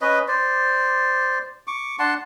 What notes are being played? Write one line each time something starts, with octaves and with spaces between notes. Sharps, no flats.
C#4 B4 D#5
C5 D5
C#6 D6
D4 F#5 A5 C6